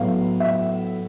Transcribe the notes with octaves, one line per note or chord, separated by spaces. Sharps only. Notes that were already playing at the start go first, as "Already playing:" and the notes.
Already playing: A2 F#3 B3 F5
E5